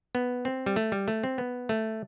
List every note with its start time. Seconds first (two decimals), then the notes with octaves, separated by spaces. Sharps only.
0.15 B3
0.45 C4
0.66 G3
0.76 A3
0.92 G3
1.08 A3
1.24 C4
1.38 B3
1.69 A3